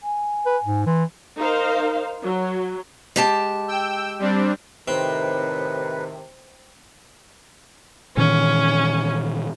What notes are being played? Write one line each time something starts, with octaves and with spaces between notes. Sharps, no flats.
G#5
B4
G#2
E3 C6
D#4 A#4 C5 F5
F#3
G#3 G4 A5
G5 E6
G3 C4 D4
A2 C3 D#3 C4 B4
A#2 D#3 E3 C#4